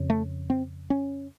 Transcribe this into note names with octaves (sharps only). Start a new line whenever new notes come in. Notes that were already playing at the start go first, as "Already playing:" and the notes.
Already playing: F2 C#3
A3
C4
C#4